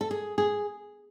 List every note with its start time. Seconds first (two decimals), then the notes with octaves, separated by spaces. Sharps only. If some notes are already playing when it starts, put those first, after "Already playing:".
0.01 A4
0.11 G#4
0.38 G#4